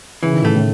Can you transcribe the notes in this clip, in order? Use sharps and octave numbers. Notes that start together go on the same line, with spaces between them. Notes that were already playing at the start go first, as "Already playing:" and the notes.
C#3 E3
D#3
A2 C#3 A3
A2